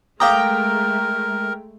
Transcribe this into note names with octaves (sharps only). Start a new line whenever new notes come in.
G#3 A3 A#4 F5 G5 A#5 D6 D#6